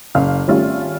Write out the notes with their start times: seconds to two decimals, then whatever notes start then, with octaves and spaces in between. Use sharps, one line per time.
0.15 F#1 F5 F6
0.48 G#1 G3 A3 C#4 F4 E5